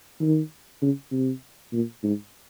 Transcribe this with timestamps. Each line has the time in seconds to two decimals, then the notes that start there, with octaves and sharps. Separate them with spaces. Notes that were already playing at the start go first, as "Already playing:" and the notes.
0.21 D#3
0.82 C#3
1.12 C3
1.73 A#2
2.03 G#2